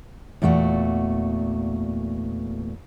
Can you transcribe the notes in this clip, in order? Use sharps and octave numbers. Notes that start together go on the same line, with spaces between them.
E2 A#2 A3 F#4